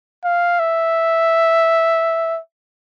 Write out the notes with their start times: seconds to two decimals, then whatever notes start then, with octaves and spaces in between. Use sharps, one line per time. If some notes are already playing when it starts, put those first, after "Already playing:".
0.25 F5
0.59 E5